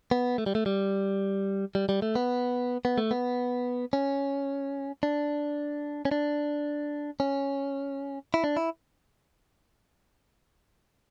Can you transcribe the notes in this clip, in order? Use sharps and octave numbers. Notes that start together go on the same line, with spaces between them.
B3
A3
G3
A3
G3
G3
G3
A3
B3
B3
A3
B3
C#4
D4
C#4
D4
C#4
E4
D4
E4